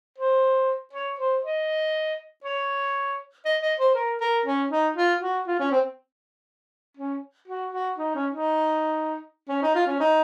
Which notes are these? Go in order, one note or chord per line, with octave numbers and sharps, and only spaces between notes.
C5
C#5
C5
D#5
C#5
D#5
D#5
C5
A#4
A#4
C#4
D#4
F4
F#4
F4
C#4
C4
C#4
F#4
F#4
D#4
C#4
D#4
C#4
D#4
F4
C#4
D#4